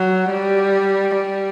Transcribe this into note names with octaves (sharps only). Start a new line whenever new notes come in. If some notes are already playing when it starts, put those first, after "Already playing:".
Already playing: F#3
G3
G3